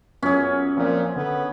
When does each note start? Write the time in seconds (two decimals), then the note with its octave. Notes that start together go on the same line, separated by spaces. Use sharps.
0.23 F#2 B3 C#4 F4 G#4
0.77 A#2 F3 A#3 C4
1.16 D3 B3